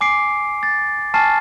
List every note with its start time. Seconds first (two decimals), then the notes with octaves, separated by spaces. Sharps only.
0.01 G#5 D6 C7 D7
0.63 A6
1.14 G#5 A5 C#6 F6 A6 C7